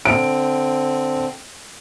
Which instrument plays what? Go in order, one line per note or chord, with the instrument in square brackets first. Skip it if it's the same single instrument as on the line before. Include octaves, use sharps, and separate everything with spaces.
[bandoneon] D3 C4 [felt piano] D7